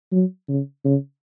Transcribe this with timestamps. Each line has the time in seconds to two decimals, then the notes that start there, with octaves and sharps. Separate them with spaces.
0.12 F#3
0.49 C#3
0.85 C#3